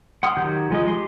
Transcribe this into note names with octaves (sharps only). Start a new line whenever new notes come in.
F#5 C6 D#6 F6
D#3 F#3 G4 A#5 G6
F3 G#3 D#4 D#5
G4 C6